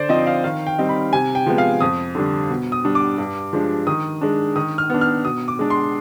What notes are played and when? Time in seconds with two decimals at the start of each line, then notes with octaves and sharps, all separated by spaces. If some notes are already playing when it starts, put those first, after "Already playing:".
Already playing: D3 C5 D5
0.09 F3 C4 D#4 D#5
0.27 F5
0.44 D#3 F5
0.67 G5
0.78 G3 C4 D#4
0.89 B5
1.13 C3 G#5
1.35 G5
1.46 F3 G#3 B3
1.58 F5
1.81 F2 D#6
2.15 D3 G3 D4
2.50 B2
2.72 D#6
2.85 G3 D4
2.95 D6
3.18 G2
3.53 F3 G#3 D4
3.87 D#3 D#6
4.21 G#3 D4
4.56 D#3 D#6
4.78 F6
4.90 B3 D4
5.01 F6
5.24 B2 D#6
5.48 D6
5.59 G#3 D4
5.70 C6